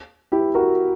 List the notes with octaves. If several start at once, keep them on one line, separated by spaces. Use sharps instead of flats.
E4 G4
F#4 A#4